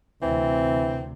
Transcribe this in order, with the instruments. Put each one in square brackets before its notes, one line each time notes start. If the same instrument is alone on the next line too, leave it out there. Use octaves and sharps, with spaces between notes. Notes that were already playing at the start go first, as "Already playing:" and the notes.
[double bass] D2 C3 [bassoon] E3 [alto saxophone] C4